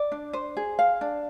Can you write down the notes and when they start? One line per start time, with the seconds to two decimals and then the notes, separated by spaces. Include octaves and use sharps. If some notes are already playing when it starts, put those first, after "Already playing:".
Already playing: D5
0.12 D4
0.33 C5
0.57 G#4
0.79 F5
1.01 D4